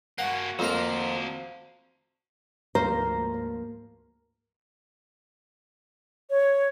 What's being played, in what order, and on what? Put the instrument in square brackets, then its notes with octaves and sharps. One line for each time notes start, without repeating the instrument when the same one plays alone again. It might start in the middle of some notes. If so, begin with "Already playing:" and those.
[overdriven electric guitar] A#3 F#4 [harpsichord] F#5
[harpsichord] F2 A#3 A#5 [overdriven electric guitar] F#4 C5
[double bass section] D2 G#2 F3 [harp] A#3 [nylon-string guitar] C5 [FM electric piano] A#5
[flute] C#5